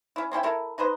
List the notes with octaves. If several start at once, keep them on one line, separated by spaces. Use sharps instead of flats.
C#4 E4
C4 C#4 E4 G5
E4 A4 A#4
D#4 B4 C5 D#5